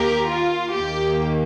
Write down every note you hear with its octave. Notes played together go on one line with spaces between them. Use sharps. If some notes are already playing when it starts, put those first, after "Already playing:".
Already playing: D#2 D#3 A#3 G4 A#4
F4
D#2 D#3 A#3 G4